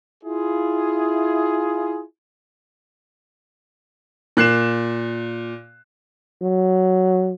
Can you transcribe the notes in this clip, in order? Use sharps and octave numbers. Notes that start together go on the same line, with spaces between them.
E4 F4 G#4
A#2 F#6 C7 E7
F#3